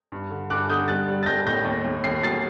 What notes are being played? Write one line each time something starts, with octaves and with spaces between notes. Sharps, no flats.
G2
D3
G2 D6 F#6
D3 D#6 G6
G3 F#6 A6
G3
A6
G3 G6 A#6
A2 G6 A#6
D#2
D#2
D#2 C7
F#3 A6 C7